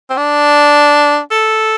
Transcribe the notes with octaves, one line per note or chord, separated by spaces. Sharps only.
C4
D4
A4